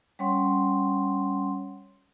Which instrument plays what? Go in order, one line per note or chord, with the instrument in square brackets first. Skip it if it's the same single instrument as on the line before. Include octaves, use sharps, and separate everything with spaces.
[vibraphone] G3 C#4 C#5 F#5 C6